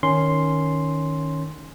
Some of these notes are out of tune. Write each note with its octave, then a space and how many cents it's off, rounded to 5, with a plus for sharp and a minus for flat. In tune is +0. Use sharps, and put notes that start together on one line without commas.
D#3 +0 C#4 +0 C6 +0